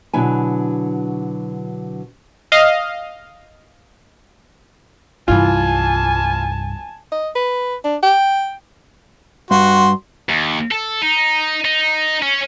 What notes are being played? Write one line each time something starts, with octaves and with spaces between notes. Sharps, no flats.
B2 D3 F#3 E4 G#5
D#5 F5
C2 G2 E3 F4 G#5 A5
D#5
B4
D4
G5
G2 F#4 C6
D#2
A4
D#4
D#4
C#4